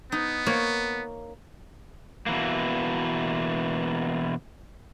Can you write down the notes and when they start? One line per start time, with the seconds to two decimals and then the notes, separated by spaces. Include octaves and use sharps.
0.12 B3 D#4
0.46 A#3 C#5
2.26 B2 E3 A#3